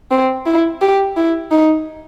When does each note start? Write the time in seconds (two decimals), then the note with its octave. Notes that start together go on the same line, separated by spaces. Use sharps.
0.11 C4
0.46 E4
0.81 G4
1.16 E4
1.51 D#4